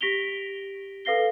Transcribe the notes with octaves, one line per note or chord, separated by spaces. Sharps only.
G4 A#6 B6 D7 F7 G7
A4 B4 F5 A#6 C7 G7